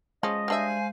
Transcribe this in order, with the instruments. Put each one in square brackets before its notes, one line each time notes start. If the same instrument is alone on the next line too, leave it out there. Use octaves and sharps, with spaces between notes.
[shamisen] F3 C#4 [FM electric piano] G#3 [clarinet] D#5
[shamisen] G3 D4 E5 [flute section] C5 F5 G#5